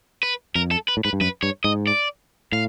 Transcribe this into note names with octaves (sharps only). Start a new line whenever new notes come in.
B4
F2 A#4
A4
B4
A2
G#2 B4
G2
F#2 B4
G2 C#5
G#2 D#5
D5
A2 F5